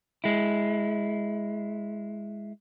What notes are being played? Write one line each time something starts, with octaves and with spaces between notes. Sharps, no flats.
G#3 E4